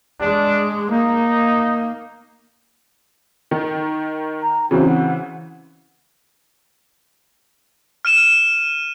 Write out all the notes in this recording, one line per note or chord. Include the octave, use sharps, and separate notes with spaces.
G#3 D4
A#3 D#4
D#3
A#5
C#3 E3 C4 F#4
F#5
F6 D#7 E7